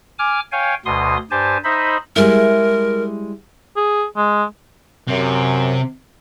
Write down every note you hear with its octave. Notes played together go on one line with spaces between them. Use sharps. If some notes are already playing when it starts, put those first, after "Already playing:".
G#5 D6 F6
C#5 F5 G5 G#5
D2 B2 C6 D#6
G2 G4 C5 G#5 A5
D#4 C5 D#5 E5 B5
G3 G#3 E4 A#4
G#4
G#3
F#2 C3